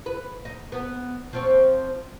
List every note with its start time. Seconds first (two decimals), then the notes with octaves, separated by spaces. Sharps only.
0.06 B4
0.45 D#4
0.72 B3
1.33 F3 C4 C#5